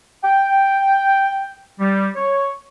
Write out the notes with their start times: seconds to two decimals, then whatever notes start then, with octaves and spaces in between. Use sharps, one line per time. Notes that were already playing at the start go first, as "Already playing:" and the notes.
0.23 G5
1.79 G3
2.15 C#5